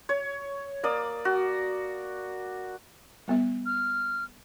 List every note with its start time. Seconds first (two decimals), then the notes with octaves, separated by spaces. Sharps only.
0.09 C#5
0.83 A#3 D5 D#6
1.25 F#4
3.28 G3 B3 E5
3.66 F6